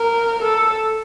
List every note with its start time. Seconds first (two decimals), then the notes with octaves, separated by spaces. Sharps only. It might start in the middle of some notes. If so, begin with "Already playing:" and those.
Already playing: A#4
0.42 A4